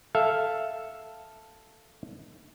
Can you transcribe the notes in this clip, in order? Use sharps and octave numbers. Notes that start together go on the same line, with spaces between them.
A4 E5 F5